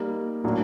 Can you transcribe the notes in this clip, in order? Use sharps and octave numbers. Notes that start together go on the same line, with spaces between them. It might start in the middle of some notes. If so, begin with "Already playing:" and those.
Already playing: G3 A#3 D#4
A2 F#3 A#3 D4 F#4